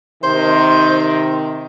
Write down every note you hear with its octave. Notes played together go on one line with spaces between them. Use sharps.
C3 D#3 C5